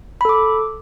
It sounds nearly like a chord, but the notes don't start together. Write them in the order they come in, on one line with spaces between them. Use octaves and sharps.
B5 A4 D6